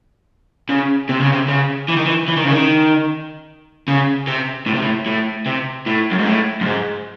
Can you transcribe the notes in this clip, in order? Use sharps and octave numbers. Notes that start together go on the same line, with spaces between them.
C#3
C3
C#3
C3
C#3
E3
D#3
E3
E3
D#3
C#3
D#3
C#3
C3
A2
C3
A2
A2
C3
A2
F#2
G#2
A2
F#2
G#2